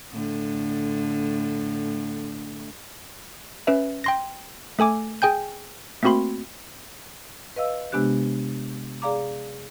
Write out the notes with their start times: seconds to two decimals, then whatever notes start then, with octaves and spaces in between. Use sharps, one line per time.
0.13 A2 D3
3.67 C#4 B4 E5
4.04 G5 C6 A#6
4.79 A3 A4 G#5 D6
5.22 G#4 G5 G#5 G6
6.03 A3 A#3 C4 F#4 B5 C6
7.56 B4 D#5 F5 E6
7.92 C3 G#3 B3 D4 G4 F#6
9.02 G#4 D5 F5 A#5 D6